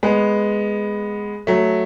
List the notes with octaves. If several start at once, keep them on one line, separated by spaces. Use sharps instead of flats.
G#3 B3
F#3 A3